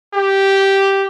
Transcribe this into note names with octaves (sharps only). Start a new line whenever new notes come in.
G4